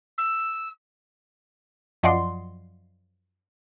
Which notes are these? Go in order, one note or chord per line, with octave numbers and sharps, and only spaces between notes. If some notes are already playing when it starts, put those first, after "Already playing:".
E6
F#2 F3 D5 D#5 F#5 C6